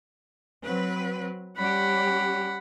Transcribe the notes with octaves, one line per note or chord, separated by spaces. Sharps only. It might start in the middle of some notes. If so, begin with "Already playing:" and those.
F#3 C4 B4
G3 C#4 G4 F#5 B5